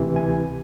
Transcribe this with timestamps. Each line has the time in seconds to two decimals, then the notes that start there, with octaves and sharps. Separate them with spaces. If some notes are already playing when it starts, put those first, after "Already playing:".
Already playing: D2 C3 E3
0.16 G#5